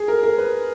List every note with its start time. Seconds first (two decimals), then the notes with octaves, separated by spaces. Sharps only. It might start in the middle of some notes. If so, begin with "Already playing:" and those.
Already playing: G#4
0.08 A#4
0.23 A#4
0.38 B4